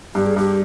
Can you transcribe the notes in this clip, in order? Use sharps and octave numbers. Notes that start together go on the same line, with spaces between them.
G2 G4
G#4
G2 G4